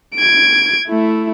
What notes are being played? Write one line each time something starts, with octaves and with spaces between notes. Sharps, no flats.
G#6 D7
A3 E4